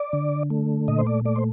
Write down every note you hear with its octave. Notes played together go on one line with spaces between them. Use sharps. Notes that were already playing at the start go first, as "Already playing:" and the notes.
Already playing: D5
D3
A3
A#2 D#5
C5
D5
A3 D5
C5